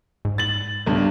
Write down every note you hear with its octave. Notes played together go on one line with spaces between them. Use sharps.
G#2
A6 F#7
B1 G2